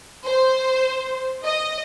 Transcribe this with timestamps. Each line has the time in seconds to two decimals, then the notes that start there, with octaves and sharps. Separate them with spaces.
0.24 C5
1.44 D#5